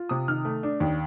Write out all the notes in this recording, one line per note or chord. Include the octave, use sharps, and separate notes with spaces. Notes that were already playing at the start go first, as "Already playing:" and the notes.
Already playing: F4
C3 D#6
D#3 F6
A3
D4
D#2